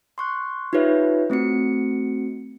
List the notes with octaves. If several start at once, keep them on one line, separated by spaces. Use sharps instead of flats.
C6 C#6 F#6
D#4 F4 G4 B4 C#5 E5
A3 C4 F#4 C#7